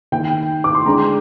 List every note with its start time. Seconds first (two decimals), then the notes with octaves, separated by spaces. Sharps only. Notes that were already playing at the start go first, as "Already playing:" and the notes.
0.12 D#3 A#3 D#4 G5
0.64 D6
0.75 C6
0.86 D3 G#3 D4 A#5